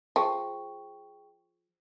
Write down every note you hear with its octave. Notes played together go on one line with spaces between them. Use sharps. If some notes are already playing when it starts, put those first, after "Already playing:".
F3 G#4 G5 C#6